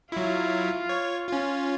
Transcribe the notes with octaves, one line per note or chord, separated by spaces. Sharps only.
F#3 E4 F4
C#5
C#4 F4